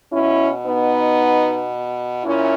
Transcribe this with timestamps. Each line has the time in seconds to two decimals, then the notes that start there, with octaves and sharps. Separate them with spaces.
0.13 B2 C#4 E4
0.66 B3 D#4
2.24 A#2 C#4 E4